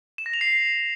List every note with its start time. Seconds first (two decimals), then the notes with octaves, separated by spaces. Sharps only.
0.18 E7
0.26 A#6
0.33 F7
0.41 C7